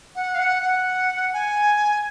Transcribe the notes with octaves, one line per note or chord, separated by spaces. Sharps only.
F#5
F5
F#5
F#5
G#5